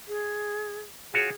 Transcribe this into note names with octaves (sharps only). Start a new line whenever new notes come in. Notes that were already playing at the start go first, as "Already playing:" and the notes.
G#4
F4 F#4 G#4 C#5